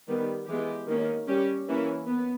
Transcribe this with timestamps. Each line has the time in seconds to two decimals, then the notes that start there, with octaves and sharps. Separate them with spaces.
0.08 D#3 G3 B3
0.48 E3 G#3 B3 G4
0.88 D#3 A#3 C#4
1.28 G3 C#4 G4
1.68 E3 A#3 C#4 E4
2.07 B3